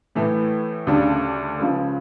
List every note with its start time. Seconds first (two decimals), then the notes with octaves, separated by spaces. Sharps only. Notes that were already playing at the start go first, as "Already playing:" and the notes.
0.15 A2 E3 A3
0.87 D2 C#3 G3 D4
1.59 C#2 C#3 F3